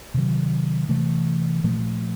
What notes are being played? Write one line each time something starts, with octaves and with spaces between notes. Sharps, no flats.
C3 D#3 F#3
C3 E3 A3
A#2 F3 A3